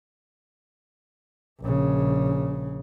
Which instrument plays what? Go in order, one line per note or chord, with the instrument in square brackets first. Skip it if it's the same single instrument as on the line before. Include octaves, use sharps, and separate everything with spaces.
[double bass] A#1 C#3